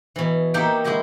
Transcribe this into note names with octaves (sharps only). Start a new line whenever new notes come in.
B2 E3
A#3 D#4 G4 E5 F#5 G5
G#3 E4 F#4 G4 D#5